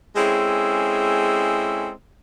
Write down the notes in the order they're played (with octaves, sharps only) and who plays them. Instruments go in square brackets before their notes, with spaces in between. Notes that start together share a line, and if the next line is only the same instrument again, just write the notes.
[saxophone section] G#3 C4 C#4 E4 G#4 A4